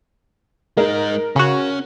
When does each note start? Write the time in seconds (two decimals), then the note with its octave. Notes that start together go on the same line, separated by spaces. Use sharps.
0.77 G#3 D#4 A#4
1.36 C#3 C#4 F#4